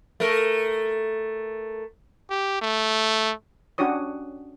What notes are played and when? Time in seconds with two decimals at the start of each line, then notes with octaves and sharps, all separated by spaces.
0.20 A3 A#4
2.30 G4
2.61 A3
3.78 C#4 D4 F#4 G4 C#5 D#6